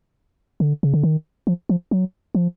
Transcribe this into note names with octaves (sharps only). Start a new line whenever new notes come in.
D3
C#3
D3
D#3
F3
F3
F#3
F3